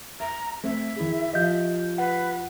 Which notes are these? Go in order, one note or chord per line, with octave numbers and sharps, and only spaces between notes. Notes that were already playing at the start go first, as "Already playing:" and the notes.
E5 A#5
A3 C4 E5
D#3 E4 G#4
F3 G4 D#5 F5 G6
B4 F#5